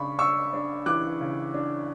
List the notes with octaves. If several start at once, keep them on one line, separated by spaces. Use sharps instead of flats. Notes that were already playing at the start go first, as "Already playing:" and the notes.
Already playing: C#3 D4 B5 C#6
D4 C#6 E6
D4
E3 D6 F#6
C#3
D4